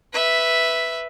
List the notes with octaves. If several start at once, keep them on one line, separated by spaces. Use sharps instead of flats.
B4 E5